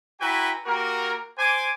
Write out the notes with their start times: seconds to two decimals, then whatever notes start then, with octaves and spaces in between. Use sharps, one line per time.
0.20 E4 F#4 B4 G5 G#5 A#5
0.65 A#3 F#4 G4 A#4
1.38 C5 G#5 D6